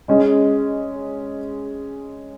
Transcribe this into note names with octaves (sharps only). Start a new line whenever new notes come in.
G#3 C#4 G#4 D#5